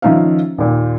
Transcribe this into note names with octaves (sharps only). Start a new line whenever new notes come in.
D#3 F3 C#4 D#4 E5 F5
D#2 A#2